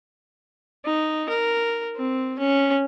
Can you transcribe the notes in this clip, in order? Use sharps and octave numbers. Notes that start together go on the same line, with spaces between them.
D#4
A#4
C4
C#4